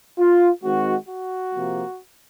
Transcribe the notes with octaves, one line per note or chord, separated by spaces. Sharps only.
F4
D#3 G#3 C4 F#4
F#4
C3 F3 A#3